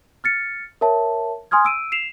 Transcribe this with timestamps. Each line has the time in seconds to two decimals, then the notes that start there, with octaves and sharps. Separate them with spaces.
0.24 F6 A6 C#7
0.81 A#4 C#5 E5 A5
1.51 G#5 C6 D#6 F6 G#6
1.65 E6 D7 D#7
1.92 C7 E7 F7